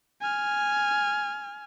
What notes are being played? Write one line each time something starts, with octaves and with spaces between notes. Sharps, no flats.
G#5 F6